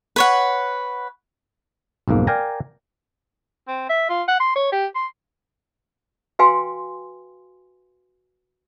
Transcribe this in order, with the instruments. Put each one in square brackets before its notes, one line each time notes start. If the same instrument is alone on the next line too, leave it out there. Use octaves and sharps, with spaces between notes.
[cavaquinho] B4 C#5 F#5
[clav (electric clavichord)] B1 F2 G#2 A#3
A#4 D5 F5 G5 G#5 A#5
[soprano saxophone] C4
E5
F4
F#5
C6
C#5
G4
C6
[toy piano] F#4 B4 F5 G5 G#5 C6